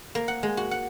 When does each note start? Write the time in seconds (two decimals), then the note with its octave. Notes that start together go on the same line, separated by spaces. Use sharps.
0.15 A#3
0.28 F#5
0.43 G#3
0.57 F#4
0.71 F#5